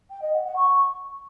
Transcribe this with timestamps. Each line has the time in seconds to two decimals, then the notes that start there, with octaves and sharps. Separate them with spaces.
0.10 G5
0.21 D#5
0.33 F#5
0.44 F#5
0.55 C#6